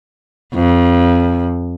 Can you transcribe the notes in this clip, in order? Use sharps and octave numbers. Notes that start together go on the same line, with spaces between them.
F2